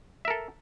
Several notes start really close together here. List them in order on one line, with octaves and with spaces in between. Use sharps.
E5 A#4 A4